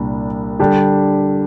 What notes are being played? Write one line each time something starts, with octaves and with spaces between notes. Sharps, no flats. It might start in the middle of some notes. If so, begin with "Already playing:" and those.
Already playing: C2 A#2 G3 D4
D3 G3 D4 G4